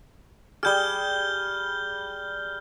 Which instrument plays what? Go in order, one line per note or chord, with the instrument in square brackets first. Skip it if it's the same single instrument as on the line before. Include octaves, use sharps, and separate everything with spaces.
[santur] G3 G#4 [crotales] F6 G6 G7